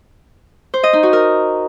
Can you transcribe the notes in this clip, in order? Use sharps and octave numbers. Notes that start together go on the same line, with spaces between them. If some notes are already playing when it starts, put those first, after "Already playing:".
C5
D#5
D#4
F#4
A#4